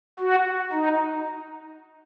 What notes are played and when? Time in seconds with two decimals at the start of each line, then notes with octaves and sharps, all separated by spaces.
0.20 F#4
0.73 D#4